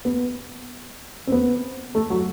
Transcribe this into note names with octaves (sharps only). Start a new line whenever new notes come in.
B3
C4
B3
A3
F#3